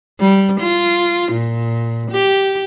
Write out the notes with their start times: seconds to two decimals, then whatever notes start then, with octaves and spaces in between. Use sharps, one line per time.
0.21 G3
0.61 F4
1.33 A#2
2.11 G4